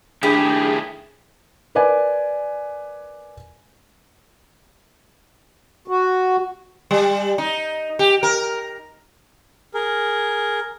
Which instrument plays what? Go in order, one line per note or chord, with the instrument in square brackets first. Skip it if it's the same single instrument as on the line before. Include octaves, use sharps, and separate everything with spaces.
[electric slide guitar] D#3 A3 E4 [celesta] D4 B5 [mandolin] G4 [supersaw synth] G#4
[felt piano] A#4 B4 D5 G#5
[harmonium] F#4
[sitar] G3
D#4
G4
A#4
[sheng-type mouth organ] G#4 A#4